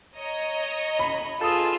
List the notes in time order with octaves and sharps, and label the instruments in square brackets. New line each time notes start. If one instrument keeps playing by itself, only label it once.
[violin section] C#5 D#5 A#5
[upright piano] B5
[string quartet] F4 G#4 [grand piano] A4 D#6 [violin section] B4 E6